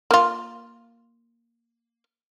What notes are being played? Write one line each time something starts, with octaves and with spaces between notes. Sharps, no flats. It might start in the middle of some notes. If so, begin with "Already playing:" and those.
A#3 F4